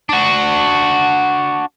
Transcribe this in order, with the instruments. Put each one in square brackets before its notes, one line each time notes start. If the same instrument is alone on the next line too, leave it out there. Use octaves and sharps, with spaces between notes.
[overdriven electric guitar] D4 F#4